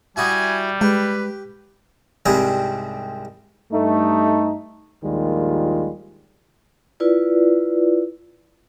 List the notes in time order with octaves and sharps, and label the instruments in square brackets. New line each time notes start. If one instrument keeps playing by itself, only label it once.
[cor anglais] G3 [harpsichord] E4 F#4 D#6 [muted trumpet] G#5
[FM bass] G#3 [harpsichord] G4 [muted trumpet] B4
[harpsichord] C2 G#2 C3 G3 G#4
[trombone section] G2 A3 D#4
A#1 D#2 D#3 G3 G#3 F4
[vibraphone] E4 F4 B4 D5